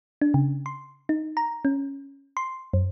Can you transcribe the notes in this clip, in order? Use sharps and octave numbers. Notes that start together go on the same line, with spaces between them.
D4
C#3
C6
D#4
A#5
C#4
C6
F#2